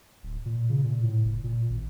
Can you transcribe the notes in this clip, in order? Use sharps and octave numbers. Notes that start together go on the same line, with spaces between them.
D1
A#2
C#3
A#2
A2
F#1
A#2
G#1